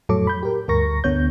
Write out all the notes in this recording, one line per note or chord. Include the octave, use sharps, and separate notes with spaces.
F2 A2 F#3 A4 C#5 D6
B5 G6
G4 A#4
D2 G2 A#4 C#6 A#6
D2 D3 B3 C#5 G6